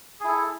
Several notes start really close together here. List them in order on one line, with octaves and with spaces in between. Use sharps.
G#4 E4 A4